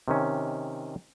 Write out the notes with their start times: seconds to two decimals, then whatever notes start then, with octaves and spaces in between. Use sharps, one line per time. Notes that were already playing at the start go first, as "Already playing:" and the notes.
0.08 C3 D#3 C#4